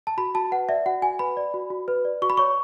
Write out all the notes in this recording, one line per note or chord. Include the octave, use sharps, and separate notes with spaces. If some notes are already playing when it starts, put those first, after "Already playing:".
A5
F#4 B5
F#4 A5
B4 F#5
D5 E5
F#4 F#5
F#4 G#5
B4 B5
D5
F#4
F#4
B4
D5
F#4 C#6
B5
C#5 C#6